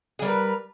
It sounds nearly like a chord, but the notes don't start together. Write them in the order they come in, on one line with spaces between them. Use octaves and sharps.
G#4 G3 A#4 B4